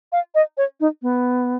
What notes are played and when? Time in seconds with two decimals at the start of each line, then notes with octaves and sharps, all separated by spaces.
0.12 F5
0.35 D#5
0.57 C#5
0.80 D#4
1.02 B3